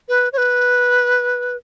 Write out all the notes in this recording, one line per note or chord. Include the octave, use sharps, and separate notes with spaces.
B4
C#5
B4